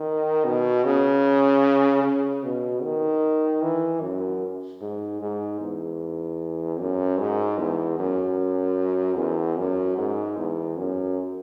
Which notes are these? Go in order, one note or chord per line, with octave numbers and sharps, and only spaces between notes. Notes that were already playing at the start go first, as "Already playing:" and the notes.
Already playing: D#3
B2
C#3
C#3
B2
D#3
E3
F#2
G#2
G#2
E2
F#2
G#2
E2
F#2
E2
F#2
G#2
E2
F#2